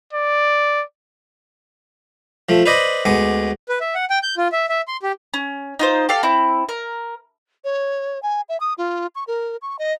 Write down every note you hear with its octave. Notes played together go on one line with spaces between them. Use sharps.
D5
F3 A3
B4 C5 D5 D#5 B5
D2 G#3 B3 D6
B4
E5
F#5
G5
G6
F4
E5
E5
C6
G4
C#4
D#4 F4 C5
G4 A4 F5
C4 E4
A#4
C#5
G#5
E5
D#6
F4
C#6
A#4
C#6
D#5